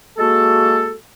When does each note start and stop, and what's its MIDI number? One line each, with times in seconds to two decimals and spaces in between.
0.18 0.94 56
0.18 0.94 58
0.18 0.94 66
0.18 0.94 69